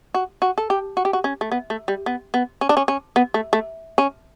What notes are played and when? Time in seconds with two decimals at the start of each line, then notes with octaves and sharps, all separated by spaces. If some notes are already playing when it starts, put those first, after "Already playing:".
0.14 F#4
0.42 F#4
0.58 A4
0.70 G4
0.97 F#4
1.05 G4
1.13 F#4
1.24 C#4
1.41 A3
1.52 B3
1.70 A3
1.88 G3
2.06 B3
2.34 B3
2.61 C#4
2.69 D4
2.77 C#4
2.88 C#4
3.16 B3
3.34 A3
3.53 A3
3.98 C#4